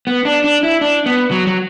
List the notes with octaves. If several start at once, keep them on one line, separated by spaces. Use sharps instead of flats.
B3
D4
D4
E4
D4
B3
F#3
F#3